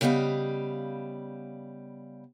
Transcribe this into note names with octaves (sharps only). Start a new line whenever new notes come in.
C#3 G3 B3 D#5 F5